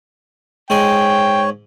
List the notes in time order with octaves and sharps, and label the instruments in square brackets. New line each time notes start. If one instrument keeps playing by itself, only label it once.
[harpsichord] G#2 G#5 [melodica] C#5 [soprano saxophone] G5